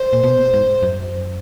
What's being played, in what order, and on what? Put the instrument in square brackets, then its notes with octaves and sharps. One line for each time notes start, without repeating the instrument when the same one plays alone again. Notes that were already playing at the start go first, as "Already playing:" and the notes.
Already playing: [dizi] C5
[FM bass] A#2
B2
G#2
F#2